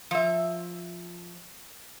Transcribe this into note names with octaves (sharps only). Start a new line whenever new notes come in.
F3 E5